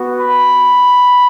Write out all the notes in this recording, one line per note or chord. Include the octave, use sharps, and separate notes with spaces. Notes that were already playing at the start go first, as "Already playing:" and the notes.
Already playing: B3 F#4
B5